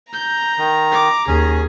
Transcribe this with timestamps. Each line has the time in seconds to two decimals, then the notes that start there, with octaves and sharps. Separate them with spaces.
0.13 A#5 G6
0.58 D#3
0.92 D6
1.27 D#2 C#4 G#4